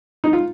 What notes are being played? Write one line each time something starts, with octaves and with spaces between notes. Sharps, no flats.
D#4
F4